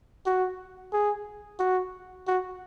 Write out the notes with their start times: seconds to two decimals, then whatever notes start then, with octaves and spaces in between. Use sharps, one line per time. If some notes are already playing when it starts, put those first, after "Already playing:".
0.26 F#4
0.93 G#4
1.59 F#4
2.27 F#4